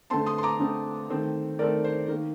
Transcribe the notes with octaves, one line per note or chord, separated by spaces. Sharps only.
D3 A3 C4 A5 C6
C6 D#6
C6
A#5 D6
D3 A3 C4
D#3 A3 C4
D#3 A3 C4 A#4 D5
C5
D#3 A#3 A#4